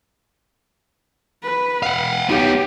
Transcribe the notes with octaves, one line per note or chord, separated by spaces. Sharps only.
B4
F5 F#5
B3 D#4 G4